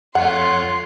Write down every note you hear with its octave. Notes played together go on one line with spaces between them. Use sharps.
F2 A3 F4 C#5 F#5 C6 F#6